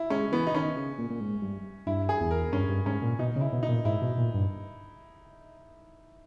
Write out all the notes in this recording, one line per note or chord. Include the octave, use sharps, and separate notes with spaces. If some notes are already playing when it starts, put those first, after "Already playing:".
Already playing: E4
G#3 C#4
E3 B3
D#4
D#3 C#4
C#3
A#2
A#2
G#2
G2
G2 E4
G#4
E2
A#4
G2 C#4
G2
G#2 C#4
A#2
B2 D#4
C#3 E4
B2
D#4
A#2
G#2 E4
B2
A#2
G2